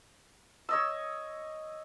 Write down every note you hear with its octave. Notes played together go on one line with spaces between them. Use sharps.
C#5 D#5 E6